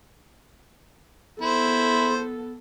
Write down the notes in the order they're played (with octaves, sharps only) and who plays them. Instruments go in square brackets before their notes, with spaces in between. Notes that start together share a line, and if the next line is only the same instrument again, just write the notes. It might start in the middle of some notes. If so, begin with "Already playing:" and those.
[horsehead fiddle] B3 A4 [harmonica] E4 C5